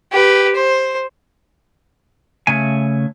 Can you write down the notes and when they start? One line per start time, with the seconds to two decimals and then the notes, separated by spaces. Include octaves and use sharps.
0.12 G4 B4
0.55 C5
2.47 C#3 A3 G#5